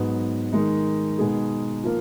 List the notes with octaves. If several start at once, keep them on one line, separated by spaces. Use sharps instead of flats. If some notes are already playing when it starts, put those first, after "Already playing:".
Already playing: G#2 F#3 B3
D#3 G#3 D#4
B2 G#3 B3 D#4 G#4
F3 A#3